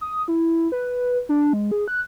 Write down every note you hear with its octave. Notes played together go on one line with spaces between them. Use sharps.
D#6
E4
B4
D4
G#3
G#4
F#6